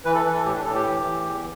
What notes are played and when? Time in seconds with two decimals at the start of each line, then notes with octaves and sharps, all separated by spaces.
0.05 E3 B4
0.15 A4
0.24 E3 B4
0.34 A4
0.45 A2 G4
0.54 D4
0.64 A2 A4
0.75 G4
0.85 E3
1.04 E3
1.24 E2